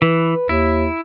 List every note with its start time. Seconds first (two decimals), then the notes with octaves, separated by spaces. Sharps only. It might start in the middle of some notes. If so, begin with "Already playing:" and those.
0.02 E3 B4
0.49 D#2 E4